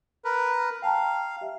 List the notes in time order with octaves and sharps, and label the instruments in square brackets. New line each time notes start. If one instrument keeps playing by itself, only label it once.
[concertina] A#4 B4
[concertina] F5 [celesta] G5 A5 A#5
[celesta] G4 E5